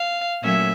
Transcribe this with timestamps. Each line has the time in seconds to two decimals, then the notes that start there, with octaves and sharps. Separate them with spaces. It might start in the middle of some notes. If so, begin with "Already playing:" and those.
Already playing: F5
0.43 A#2 F#3 A3 C#4 E5